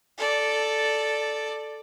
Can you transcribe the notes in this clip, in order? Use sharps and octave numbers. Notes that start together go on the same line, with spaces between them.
A4 D5